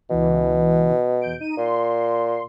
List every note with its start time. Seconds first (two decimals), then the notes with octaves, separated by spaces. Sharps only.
0.10 C#2 B2 E3
1.21 E2 G6 D7
1.40 D#4 D#7
1.58 A#2 C6